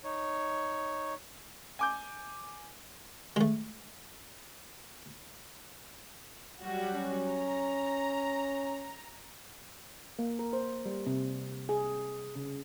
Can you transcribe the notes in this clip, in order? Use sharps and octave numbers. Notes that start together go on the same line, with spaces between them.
D#4 C#5
G#5 D6 G6
G#3 A3
F#3 G3 F#4
C#4
A#5
A#3
A#4
C5
G3
C3
G#4
C#3